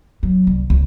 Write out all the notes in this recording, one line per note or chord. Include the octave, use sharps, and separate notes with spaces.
F#3
C2
C#2